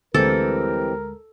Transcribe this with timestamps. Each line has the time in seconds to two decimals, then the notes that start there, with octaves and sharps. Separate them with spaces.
0.14 D2 E3 G3 G#3 C4 A4 A#4